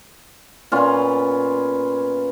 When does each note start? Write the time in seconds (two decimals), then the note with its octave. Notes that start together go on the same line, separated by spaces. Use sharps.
0.72 A#2 B3 C#4 F4